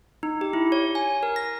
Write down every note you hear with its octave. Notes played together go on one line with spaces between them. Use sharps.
D#4
G4
E4
C#5
G#5
A#4
A#6